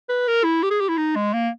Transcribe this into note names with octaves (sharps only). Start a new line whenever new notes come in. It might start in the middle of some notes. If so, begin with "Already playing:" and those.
B4
A#4
E4
G4
G#4
G4
E4
D#4
G#3
A#3